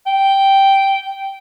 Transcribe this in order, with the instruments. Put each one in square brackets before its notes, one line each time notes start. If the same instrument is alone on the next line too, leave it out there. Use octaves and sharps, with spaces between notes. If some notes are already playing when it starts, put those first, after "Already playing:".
[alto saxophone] G5